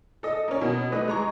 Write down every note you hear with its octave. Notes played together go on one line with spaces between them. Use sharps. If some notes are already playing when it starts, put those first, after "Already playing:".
A4 D#5
A#3 C#4
B2
A3 B4 D#5
G#3 A#5 C#6